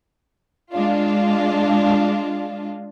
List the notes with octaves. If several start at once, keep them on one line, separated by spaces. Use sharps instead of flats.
G#3 D4 F4